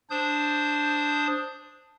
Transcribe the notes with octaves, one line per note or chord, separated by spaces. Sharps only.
D4 C5 D#6 G6